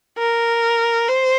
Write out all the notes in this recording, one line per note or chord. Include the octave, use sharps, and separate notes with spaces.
A#4
C5